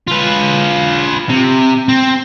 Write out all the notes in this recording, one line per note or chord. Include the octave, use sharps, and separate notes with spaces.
F4 B4
C3
C4